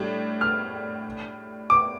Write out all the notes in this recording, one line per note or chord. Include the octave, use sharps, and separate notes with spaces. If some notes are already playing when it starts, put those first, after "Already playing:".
Already playing: A2 G3 D4
F6
D6